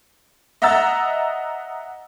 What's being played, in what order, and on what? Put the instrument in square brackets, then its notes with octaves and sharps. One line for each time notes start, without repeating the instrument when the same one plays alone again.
[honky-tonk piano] D#5 E5 F#5 A#5 E6 A6